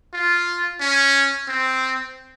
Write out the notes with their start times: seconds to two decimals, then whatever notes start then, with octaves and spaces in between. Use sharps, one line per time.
0.13 F4
0.80 C#4
1.48 C4